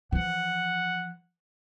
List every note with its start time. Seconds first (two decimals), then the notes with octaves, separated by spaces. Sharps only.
0.12 E3 F3 F#5